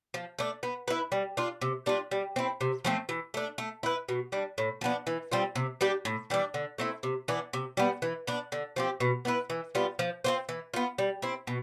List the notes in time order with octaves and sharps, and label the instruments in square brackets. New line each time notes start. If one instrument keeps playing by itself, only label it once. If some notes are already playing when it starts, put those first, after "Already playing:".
[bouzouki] F3
A3 D4
B3
E4 B4
G3
D4 F4
C3
G3 D4 F4
G3
C4 E4
C3
F3 A3 C4
E3
A3 D4
A3
E4 B4
B2
G3 D4
A2
F3 B3 D4
E3
G3 C4 F4
C3
G3 D4 G4
A2
E3 G3 D4
D3
A3 C4 E4
C3
E3 B3 D4
C3
G3 B3
E3
B3 D4
D3
F3 C4 G4
B2
B3 E4 B4
E3
G3 B3 F4
F3
C4 F4 C5
E3
B3 F4
G3
C4 E4
B2